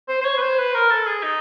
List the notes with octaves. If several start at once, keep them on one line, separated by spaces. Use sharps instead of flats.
C5
C5
C#5
B4
C5
B4
A#4
A4
G#4
D#4